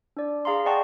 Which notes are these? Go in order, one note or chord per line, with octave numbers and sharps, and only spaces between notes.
D4 D5
G#4 F5 A#5 C6
D5 D#5 F#5 G5 A5 C#6